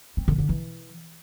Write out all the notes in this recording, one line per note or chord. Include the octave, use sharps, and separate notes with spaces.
C4
D3
D3
E3